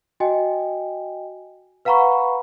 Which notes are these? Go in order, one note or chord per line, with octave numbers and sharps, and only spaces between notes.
F#4 D#5 G5 G#5
B4 F5 F#5 A#5 B5 C#6